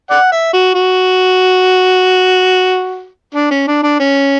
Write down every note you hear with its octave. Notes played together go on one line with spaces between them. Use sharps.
D5 F#5
E5
F#4
F#4
D4
C#4
D4
D4
C#4